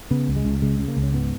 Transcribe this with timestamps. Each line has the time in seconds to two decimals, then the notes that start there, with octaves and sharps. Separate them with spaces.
0.11 C#3 B3
0.28 C#2
0.36 G#3
0.45 C#2
0.62 C#3 G#3
0.79 C#3
0.88 A#3
0.97 C#2
1.03 C#4
1.13 G#2 B3